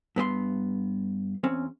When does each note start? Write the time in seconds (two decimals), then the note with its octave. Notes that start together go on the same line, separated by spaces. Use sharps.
0.16 G2 B3 G4 C6
1.43 E2 C4 C#4